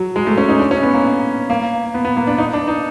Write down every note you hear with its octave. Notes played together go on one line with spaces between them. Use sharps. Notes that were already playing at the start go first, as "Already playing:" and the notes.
Already playing: F#3
G#3
A3
C#4
D#4
D4
C#4
B3
A#3
A#3
B3
B3
A#3
D4
D#4
D4
D#4